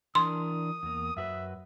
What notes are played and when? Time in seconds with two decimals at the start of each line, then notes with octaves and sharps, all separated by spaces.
0.15 E3 D4 A#4 C6 D#6
0.83 E2 A#3
1.17 F#2 F#4 B4 E5